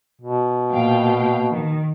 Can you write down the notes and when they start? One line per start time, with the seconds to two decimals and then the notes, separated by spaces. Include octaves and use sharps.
0.21 B2
0.72 A#2 F5 G5
1.51 D#3